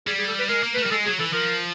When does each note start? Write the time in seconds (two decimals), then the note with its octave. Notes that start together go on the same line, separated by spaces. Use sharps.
0.07 G3 G#4
0.18 G#4
0.28 A4
0.39 B4
0.49 G#3 A#4
0.63 A#3
0.74 A3 B4
0.83 G3 A#4
0.91 G#3 A4
1.06 F#3 G#4
1.19 E3 A4
1.33 F3 A#4